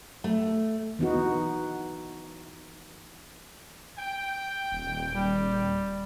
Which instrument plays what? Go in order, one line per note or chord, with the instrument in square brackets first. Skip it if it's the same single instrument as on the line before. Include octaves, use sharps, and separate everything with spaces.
[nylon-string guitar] A3
[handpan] E3 B3 D#4 F#4
[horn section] G5
[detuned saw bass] D#1
[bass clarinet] G3